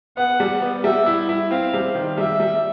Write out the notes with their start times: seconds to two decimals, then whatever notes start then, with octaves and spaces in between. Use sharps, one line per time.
0.17 B3 F#5
0.40 G3
0.62 B3
0.84 G3 E5
1.06 E4
1.29 E4
1.51 C4 F5
1.74 G3
1.95 D#3
2.18 G3 E5
2.40 G3